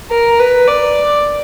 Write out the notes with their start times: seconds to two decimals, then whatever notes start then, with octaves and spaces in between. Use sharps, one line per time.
0.11 A#4
0.39 B4
0.68 D5